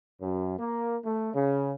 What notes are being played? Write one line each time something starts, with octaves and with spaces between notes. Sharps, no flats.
F#2
A#3
A3
C#3